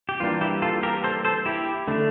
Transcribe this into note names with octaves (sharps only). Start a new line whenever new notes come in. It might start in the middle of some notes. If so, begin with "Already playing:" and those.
G4
E3 G3 A#3 D4 F4
E4 G4
F4 A4
G4 A#4
A4 C5
A4 C5
E4 G4
D3 A3 D4